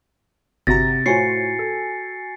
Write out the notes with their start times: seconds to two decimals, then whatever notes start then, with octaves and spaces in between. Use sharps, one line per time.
0.67 G1 C3 F#4 A#5 A6 A#6
1.06 A2 F4 F#4 C5 C#5 G#5 C7 C#7
1.59 A4